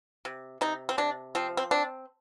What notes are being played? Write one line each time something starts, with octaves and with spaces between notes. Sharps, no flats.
C3
C3 D#4
C4
C3 D4
F3 C4
C4
C4 D4